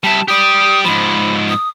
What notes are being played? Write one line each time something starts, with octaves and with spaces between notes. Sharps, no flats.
G3 E5 A5
G4 D5 D#6
G#2 F3 B5
D#6